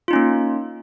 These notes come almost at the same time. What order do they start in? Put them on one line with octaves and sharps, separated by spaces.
F4 D#4 C#4 A#3